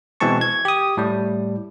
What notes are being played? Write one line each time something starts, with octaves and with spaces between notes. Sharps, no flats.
B2 E3 G#3 C4 A5 C#6
G#6
G4 D#6
A2 G3